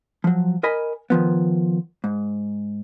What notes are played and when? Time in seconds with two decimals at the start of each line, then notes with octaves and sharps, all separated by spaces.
0.24 F3 F#3
0.63 A#4 D#5 G#5 B5
1.10 D#3 F3 B3
2.04 G#2